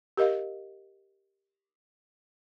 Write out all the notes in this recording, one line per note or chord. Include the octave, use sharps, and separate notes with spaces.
G4 A#4 D#5 F5